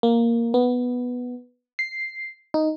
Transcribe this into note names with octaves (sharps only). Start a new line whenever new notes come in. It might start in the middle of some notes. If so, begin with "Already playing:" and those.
A#3
B3
C7
D#4